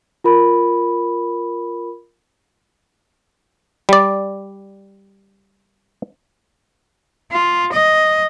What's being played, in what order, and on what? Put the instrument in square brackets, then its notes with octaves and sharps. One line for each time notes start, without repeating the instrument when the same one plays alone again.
[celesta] F4 A#4 B5
[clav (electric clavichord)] G3 D5
[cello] F4
D#5